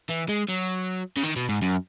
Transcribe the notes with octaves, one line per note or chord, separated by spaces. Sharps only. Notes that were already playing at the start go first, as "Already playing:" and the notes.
E3
G#3
F#3
C#3
D#3
B2
G#2
F#2